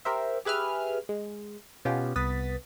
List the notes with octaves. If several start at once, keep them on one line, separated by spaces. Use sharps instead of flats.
G4 A#4 C5 E5
G4 G#4 B4 E5 F6
G#3
B2 B3 C#4 F4 G4
C2 B3 D#6 A6 B6